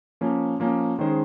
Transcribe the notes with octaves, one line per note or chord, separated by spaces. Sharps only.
F3 A#3 C#4
F3 A#3 C#4
D#3 G#3 C#4 G#4 C5